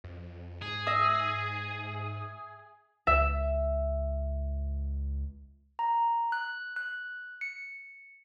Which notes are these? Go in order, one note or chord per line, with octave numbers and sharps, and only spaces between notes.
F2
G#2 G#4
E5 D#6 A#6
C#2 E5
A#5
F#6
F#6
C#7